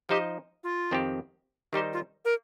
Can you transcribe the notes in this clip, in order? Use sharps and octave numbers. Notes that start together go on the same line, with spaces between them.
F3 D#4 G4 C5 D#5
F4
F2 D#3 C4 G4
D#3 G3 D#4 G4 C5
F4
A#4